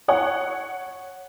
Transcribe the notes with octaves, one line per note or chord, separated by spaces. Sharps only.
C#5 F#5